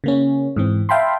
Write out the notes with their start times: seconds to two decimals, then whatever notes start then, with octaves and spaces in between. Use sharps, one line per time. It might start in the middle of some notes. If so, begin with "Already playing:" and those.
0.04 C#3 A#3 C#4
0.56 G#2 E3 C4
0.89 E5 F5 G5 A5 B5 C6